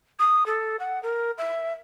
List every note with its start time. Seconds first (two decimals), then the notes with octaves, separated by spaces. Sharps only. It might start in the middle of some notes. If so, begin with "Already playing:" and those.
0.19 D#6
0.46 A4
0.79 F#5
1.03 A#4
1.38 E5